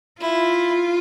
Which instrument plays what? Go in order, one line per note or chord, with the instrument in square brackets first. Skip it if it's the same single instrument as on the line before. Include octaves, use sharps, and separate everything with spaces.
[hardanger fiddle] E4 [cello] F4